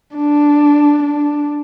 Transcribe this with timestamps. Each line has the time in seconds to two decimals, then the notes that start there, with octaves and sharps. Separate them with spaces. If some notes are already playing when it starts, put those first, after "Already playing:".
0.16 D4
1.03 D4